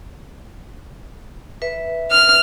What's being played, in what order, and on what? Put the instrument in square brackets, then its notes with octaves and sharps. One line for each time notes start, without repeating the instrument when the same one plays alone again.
[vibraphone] B4 E5
[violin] F6